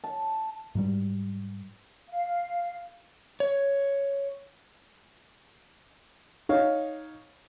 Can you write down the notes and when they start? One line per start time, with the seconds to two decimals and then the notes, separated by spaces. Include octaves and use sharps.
0.04 A5
0.75 G#2 F#3 G3
2.09 F5
3.40 C#5
6.49 D#4 C#5 F5